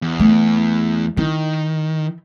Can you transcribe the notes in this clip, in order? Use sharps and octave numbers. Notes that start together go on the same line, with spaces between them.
E2
A3
D#3 E4